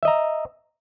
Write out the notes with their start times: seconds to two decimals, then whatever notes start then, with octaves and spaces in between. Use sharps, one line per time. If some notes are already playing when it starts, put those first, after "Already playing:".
0.03 E5
0.05 D#5
0.08 A#5